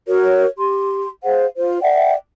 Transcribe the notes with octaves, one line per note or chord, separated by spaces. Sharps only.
F#4 A#4 C#5
G4 C6
G#4 C5 F5 F#5
F4 C5
D5 E5 F#5 G5